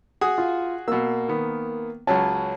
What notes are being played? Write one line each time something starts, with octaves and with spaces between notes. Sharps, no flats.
F#4 G#4 D#6
F4
B2 A#3 E6
D#3 B3
C#2 F#3 C#4 A5